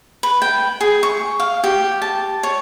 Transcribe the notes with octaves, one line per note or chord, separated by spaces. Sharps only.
B4
G5
G#4
C#6
F5
G4
A5
C#5